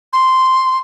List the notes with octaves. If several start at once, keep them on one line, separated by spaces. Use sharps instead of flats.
C6